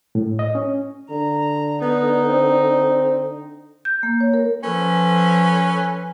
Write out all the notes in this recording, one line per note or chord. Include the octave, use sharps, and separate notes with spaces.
A2
D#5
C#4
D3 A#5
B3 D#4
C4
G6
A#3
C#5
A#4
F3 C#4 A4 B4